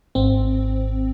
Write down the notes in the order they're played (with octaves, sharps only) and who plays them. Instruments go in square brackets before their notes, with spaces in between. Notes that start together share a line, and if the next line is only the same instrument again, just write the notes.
[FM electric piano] G#1 C4